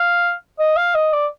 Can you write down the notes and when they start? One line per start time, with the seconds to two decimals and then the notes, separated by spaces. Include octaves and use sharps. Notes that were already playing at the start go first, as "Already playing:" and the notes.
Already playing: F5
0.59 D#5
0.76 F5
0.95 D#5
1.13 D5